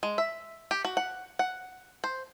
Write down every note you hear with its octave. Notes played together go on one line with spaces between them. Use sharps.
G#3
E5
G4
F#4
F#5
F#5
C5